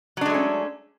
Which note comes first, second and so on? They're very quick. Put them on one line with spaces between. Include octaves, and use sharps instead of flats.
F#3 D4 G#3 A3 C#4